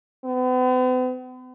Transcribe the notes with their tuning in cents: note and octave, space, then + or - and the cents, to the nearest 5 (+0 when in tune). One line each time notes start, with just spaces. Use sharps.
B3 +45